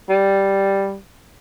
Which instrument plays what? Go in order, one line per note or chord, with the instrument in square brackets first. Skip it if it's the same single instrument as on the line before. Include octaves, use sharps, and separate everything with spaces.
[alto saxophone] G3